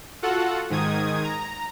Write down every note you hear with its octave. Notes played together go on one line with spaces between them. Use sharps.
F4 F#4 A4 F#5
G#2 D#3 D#6 G#6
A#5